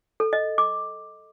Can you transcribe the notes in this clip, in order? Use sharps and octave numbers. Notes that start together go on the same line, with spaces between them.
A4
D#5
D6